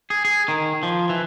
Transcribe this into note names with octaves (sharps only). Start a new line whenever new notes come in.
G#4
G#4
D#3
F3
E3